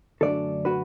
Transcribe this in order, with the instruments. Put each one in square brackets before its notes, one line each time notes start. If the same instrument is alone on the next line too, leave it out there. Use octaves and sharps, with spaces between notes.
[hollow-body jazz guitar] F#2 D3 A3 D4 A4 D5
F#4 B4